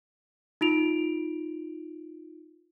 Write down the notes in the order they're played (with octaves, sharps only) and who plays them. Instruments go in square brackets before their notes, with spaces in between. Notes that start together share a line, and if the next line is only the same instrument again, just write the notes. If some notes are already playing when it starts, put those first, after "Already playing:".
[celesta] D#4 F4 D7 F7